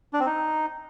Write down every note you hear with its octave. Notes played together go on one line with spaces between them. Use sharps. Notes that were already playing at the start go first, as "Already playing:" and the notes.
D4
C4
D#4